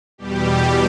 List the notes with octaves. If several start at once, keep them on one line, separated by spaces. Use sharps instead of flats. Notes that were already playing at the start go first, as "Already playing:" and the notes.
E2 B2 G3 G4